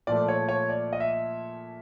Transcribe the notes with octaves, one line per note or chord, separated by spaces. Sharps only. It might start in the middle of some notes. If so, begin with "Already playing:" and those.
A#2 F3 A3 D5
C#5
C#5
D5
D#5
E5